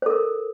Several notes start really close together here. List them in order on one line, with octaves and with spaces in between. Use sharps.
C5 A4 A#4